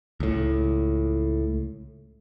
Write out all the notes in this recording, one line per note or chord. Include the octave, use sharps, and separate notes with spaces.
C#2 A2